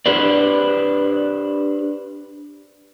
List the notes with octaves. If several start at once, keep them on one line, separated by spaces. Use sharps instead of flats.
D4 G4 B4 C5 D5